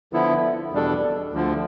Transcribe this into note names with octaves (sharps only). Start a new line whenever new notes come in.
D3 F3 B3 E4
E2 B2 G3 D4 A4
D2 D3 F3